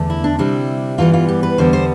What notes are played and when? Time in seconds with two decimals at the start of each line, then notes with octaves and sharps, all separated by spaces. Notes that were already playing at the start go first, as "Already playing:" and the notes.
Already playing: E2 D3 A3
0.10 E4
0.24 D4
0.39 C3 G3 C4 E4
0.98 G2 E3 G3 B3 F4
1.14 F4
1.29 G4
1.43 B4
1.58 E2 D3 G3 B3 C5
1.73 C5